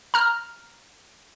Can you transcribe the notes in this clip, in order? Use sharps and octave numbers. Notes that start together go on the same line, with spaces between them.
A#5 F6